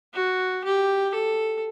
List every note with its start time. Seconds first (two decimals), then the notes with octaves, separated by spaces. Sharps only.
0.14 F#4
0.64 G4
1.14 A4